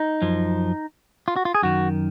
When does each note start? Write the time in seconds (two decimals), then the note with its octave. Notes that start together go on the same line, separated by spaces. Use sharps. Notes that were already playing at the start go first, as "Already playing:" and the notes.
Already playing: D#4
0.22 F#2 F3
1.28 F4
1.36 F#4
1.45 F4
1.55 G#4
1.62 F#2 D#3 F#4